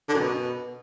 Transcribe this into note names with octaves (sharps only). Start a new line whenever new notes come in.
D3
F#2
B2